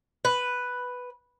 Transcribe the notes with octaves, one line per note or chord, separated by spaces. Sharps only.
B4